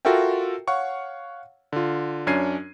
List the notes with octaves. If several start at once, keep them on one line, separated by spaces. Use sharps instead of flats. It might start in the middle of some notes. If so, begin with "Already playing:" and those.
F4 F#4 A4 A#4 E5 G5
C#5 F5 F#5 C#6
D3 F4
F#2 C#4 D4 G#6 C7 D#7